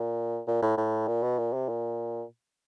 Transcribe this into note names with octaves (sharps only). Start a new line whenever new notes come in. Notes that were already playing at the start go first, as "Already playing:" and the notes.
Already playing: A#2
A#2
A2
A2
A#2
B2
A#2
C3
A#2